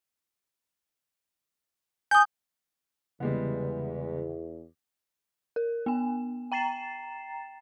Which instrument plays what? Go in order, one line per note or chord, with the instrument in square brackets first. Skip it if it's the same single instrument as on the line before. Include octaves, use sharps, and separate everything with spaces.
[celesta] G#5 D#6 [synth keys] G6
[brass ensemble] E2 [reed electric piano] C#3 [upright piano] G3 G#3 B3
[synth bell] A#4
B3 G#5
G5 A#5 A6 C7 E7